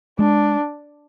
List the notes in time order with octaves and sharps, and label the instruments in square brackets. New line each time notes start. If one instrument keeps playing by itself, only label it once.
[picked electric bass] G#3 [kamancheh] D4